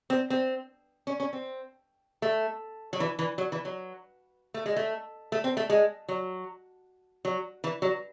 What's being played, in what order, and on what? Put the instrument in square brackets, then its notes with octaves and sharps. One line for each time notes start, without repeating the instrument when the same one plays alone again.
[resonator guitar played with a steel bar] C4
C4
C#4
C#4
C4
A3
F#3
E3
E3
F#3
E3
F#3
A3
G#3
A3
A3
C4
A3
G#3
F#3
F#3
E3
F#3